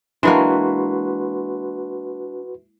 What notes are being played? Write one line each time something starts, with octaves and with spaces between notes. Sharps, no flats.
E3 G#3 A#3 D4 F#4 B4 C6